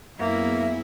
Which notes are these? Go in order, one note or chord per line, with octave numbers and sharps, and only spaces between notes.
F#2 A#3 B3 E4 G#4 E5